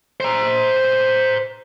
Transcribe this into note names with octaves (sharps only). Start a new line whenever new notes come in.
C5 A#5